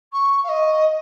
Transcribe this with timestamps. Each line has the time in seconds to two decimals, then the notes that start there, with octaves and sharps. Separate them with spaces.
0.12 C#6
0.43 F5
0.48 D#5